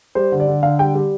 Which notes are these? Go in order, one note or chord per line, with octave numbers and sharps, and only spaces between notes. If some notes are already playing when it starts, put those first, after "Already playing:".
G3 C5
D3
D5
D3
D3 F5
G3 G5
G3